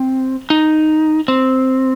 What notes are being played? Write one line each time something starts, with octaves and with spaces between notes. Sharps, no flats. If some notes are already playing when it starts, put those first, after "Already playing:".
Already playing: C4
D#4
C4